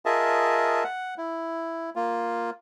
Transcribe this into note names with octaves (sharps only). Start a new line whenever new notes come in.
F4 G#4 A#4 D#5 E5 A5
F#5
E4
A#3 F4